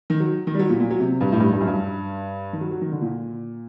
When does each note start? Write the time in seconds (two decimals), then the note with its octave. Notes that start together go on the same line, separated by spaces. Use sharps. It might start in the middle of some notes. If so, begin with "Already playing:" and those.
0.10 D#3
0.20 F#3
0.47 D#3
0.55 G3
0.59 F#3
0.70 A#2
0.80 A#2
0.91 F#3
1.00 C3
1.21 G2
1.32 A2
1.40 G2
1.53 G2
1.61 F#2
1.67 G2
2.53 D#3
2.61 F#3
2.71 F#3
2.82 D#3
2.92 D3
3.01 A#2